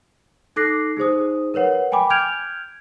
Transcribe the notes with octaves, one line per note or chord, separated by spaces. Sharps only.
D#4 A4 D6 F#6 A#6 C7
D#4 G#4 C5 D#6
A#4 B4 C#5 F#5
G5 G#5 B5 D6
F6 G6 G#6 D7 F7